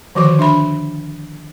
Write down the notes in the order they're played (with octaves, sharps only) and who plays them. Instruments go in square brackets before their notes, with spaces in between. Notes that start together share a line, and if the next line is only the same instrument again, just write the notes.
[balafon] D3 D#3 F3 F#4 C#6
D4 E5 B5